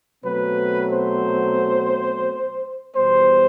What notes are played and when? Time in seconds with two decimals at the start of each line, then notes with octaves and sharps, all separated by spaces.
0.24 B2 F#3 A3 C4 B4
0.92 C5
2.95 E2 B2 G3 B3 C5